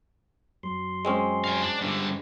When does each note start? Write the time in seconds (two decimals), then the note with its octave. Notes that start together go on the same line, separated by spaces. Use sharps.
0.63 F#2 F#3 C6
1.05 G#3 C4 C#4
1.44 F5 G#5
1.62 D4
1.81 G2 D3